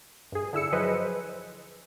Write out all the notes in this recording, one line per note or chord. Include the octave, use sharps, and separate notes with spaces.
G2 G#4
D3 E4 E6 C#7
F3 F#3 G#4 B4 C5 D#5